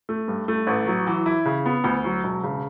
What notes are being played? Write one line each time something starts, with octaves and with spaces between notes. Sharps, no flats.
A3
G2
A3
A1
F#3
E3
E4
C#3
B3
D2
F#3
E1
C#3